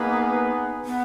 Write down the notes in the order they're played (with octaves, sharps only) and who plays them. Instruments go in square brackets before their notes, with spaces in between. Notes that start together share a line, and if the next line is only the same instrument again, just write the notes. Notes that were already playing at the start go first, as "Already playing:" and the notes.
Already playing: [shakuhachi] A#3 [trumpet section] B3 D#4 G#4 B4
[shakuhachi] B3